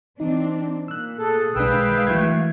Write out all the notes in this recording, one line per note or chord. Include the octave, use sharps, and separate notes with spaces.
E3 C4 D4 D#4
A#2 E6 F#6
G#4 A4
B1 D#3 G#3 D4 B4 F5 G5 E6
E3 F#3 A3 G#6